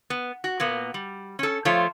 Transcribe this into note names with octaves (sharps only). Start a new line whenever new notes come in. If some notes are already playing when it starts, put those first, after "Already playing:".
B3
F#4
A#2 A#3 B3
G3
C#4 A4
F3 A3 F4 C5 C#5